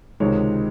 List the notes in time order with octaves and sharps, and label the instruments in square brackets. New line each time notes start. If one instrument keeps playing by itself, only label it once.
[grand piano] C#2 C3 D#3 G#3 C#5